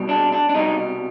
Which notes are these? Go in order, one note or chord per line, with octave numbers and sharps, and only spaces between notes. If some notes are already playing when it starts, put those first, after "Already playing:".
Already playing: C2 B2 G3
D4
D4
D4
C2 B2 G3 D#4